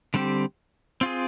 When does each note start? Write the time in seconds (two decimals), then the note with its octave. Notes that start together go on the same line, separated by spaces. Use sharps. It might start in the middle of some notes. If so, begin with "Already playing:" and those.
0.14 D3 G3 C4 G4
1.01 C4 F4 G#4